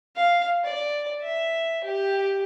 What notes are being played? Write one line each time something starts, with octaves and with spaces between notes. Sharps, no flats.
F5
D5
E5
G4